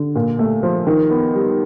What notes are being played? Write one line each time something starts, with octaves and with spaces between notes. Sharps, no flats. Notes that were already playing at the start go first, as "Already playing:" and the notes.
Already playing: D3
A#2
A3
F3
D#3
B3
G3